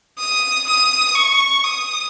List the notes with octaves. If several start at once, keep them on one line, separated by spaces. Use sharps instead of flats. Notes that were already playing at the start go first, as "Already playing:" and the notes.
D#6
D#6
C#6
D#6